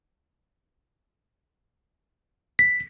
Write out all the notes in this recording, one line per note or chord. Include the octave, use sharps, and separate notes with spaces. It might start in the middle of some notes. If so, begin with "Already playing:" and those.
B6